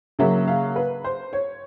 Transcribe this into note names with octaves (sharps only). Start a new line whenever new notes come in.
C#3 F#3 A#3 E5
F5
B4
C5
C#5